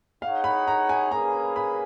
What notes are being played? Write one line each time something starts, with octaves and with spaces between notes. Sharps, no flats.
D#4 G#4 C#5 F5 F#5
B5
A#5
G#5
A#3 C#4 G#4 B4 A#5
B5